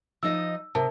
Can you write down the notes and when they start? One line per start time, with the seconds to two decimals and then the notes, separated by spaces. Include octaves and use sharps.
0.23 F3 D#4 D#5 E6
0.75 C3 A#4 A5